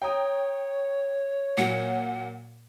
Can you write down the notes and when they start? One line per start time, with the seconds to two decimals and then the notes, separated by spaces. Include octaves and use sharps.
0.02 C#5 G5 A#5 D#6
1.57 A#2 F#3 F#5